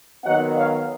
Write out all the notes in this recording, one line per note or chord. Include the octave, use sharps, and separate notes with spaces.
D#3 F#3 B3 D#5 F#5
C#5 F5